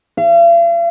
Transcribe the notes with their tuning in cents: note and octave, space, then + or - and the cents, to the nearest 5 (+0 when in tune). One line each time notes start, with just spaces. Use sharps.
F5 -45